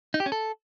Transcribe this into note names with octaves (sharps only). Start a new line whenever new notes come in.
D#4
G4
C#4
A4